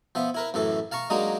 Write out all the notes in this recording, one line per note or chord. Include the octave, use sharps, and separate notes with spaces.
F3 B3 E5
E4 A#4 B4
F#2 A2 E3 A4
F5 A5 A#5 C#6
F#3 G#3 A#3 D4 D#4